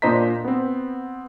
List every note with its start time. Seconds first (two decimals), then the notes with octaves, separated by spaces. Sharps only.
0.02 A#2 D4 C5 D#5 A#5 B6
0.45 B3 C4